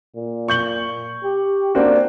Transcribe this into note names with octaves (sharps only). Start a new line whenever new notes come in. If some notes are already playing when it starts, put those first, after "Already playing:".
A#2
C#6 G6 F#7
G4
A#3 C4 D4 F#4